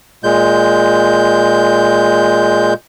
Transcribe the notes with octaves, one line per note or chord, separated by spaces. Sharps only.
A#2 G#3 G6